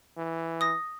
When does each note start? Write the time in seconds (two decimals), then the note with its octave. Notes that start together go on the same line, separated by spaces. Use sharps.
0.18 E3
0.61 D#6 A#6